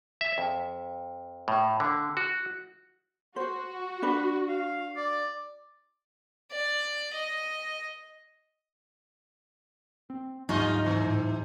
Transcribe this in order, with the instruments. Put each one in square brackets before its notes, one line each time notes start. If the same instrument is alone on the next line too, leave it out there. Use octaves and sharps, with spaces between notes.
[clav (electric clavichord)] E5
F2
A2
D3
F#4
[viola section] F#4 [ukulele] C5
[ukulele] D4 B4
[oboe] F5
D5
[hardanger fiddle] D5
D#5
[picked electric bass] C4
[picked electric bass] D2 G#2 F#3 [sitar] G3 F4 D#5 [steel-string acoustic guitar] D#4
[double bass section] A2 [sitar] C3 E3